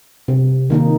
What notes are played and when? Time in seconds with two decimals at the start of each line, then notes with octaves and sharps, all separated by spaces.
0.28 C3
0.70 D#3 A#3 D#4